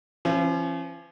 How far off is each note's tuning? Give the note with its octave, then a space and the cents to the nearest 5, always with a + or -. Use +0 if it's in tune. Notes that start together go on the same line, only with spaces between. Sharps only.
F3 -45 C#4 -35 C5 +10